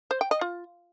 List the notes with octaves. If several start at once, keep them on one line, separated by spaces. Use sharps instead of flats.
C5
G5
D#5
F4